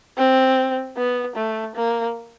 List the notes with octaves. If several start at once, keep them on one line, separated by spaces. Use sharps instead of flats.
C4
B3
A3
A#3